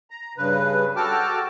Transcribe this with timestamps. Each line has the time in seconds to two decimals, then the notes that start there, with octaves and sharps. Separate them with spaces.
0.10 A#5
0.37 G2 C#3 B4
0.96 F#4 A4 G5 A5 D6 F6